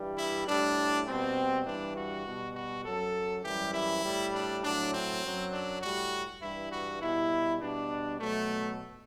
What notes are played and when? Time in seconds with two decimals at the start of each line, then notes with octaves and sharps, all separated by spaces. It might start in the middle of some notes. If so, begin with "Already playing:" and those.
Already playing: G2 E3 G3
0.18 E4
0.47 A2 G3 D4
1.06 B2 G3 C4
1.66 G2 E3 G3 D4
1.96 F#4
2.26 B2 G3
2.56 F#4
2.85 F#2 F#3 A4
3.44 F#2 E3 G3 G4
3.74 E4
4.04 A2 G3
4.34 D4
4.63 A2 F#3 D4
4.93 C4
5.22 F#2 F#3
5.53 D4
5.82 A2 G3 F#4
6.41 G2 E3 G3 E4
6.71 F#4
7.01 B2 G3 E4
7.60 B2 G3 D4
8.20 B2 F#3 A3